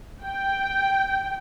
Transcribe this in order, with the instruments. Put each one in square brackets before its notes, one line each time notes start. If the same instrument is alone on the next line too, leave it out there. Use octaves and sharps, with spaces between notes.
[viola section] G5